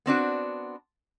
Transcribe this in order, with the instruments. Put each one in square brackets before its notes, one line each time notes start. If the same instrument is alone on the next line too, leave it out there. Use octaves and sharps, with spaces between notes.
[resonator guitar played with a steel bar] B3 C4 D4 F#4